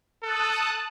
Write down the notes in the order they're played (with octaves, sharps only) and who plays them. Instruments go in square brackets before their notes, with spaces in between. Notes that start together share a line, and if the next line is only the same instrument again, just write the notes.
[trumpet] A4 [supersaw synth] A5 D#6 F#6